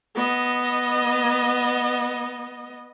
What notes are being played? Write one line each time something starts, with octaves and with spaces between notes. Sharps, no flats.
B3 D#5